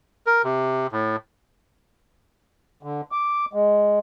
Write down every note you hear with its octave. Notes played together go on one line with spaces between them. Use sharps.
A#4
C3
A2
D3
D6
G#3